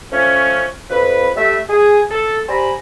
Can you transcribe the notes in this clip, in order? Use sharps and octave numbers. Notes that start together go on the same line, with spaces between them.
F3 A3 C#4
F2 B4
G3 A3 E5
G#4
A4
G4 C5 D5 G#5 A#5 B5